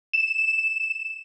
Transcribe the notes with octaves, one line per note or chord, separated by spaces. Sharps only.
E7